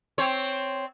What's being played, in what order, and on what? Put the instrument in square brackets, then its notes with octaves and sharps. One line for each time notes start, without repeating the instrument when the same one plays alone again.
[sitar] C4 C#5